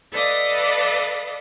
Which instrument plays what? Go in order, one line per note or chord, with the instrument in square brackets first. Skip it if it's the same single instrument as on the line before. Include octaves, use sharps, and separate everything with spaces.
[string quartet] A4 B4 D5 D#5 F5